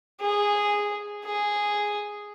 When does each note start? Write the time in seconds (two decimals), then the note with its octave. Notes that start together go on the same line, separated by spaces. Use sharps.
0.22 G#4
1.25 G#4